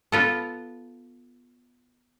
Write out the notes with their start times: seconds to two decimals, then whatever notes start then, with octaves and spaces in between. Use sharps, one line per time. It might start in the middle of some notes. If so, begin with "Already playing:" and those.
0.12 B3 F4 A4